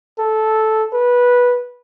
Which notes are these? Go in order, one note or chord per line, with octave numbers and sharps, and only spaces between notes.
A4
B4